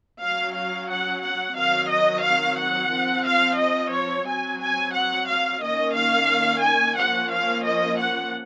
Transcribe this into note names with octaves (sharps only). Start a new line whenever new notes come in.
F#3 C#4 F5
F5
F#5
F#5
D#3 F#3 C4 F5
D#5
F5
F#5
F3 C4
F5
D#5
C#5
F#3 C4 G#5
G#5
F#5
F5
D#3 A#3 C#4 D#5
F5
G#5
F3 A#3 C#4 F#5
F5
D#5
F#5